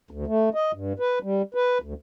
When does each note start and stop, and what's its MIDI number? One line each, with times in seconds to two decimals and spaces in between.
0.11 0.25 38
0.27 0.49 57
0.54 0.72 75
0.73 0.93 43
0.99 1.19 71
1.23 1.42 55
1.54 1.78 71
1.82 1.94 38